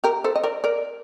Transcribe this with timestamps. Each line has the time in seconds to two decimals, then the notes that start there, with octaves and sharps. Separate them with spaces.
0.04 G4 A#4
0.24 A4 C5
0.36 D#5
0.44 A#4 D5
0.64 A#4 D5